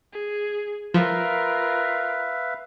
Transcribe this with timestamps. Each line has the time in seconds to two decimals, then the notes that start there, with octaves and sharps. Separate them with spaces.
0.12 G#4
0.94 F3 F4 A#4 B4 E5 F5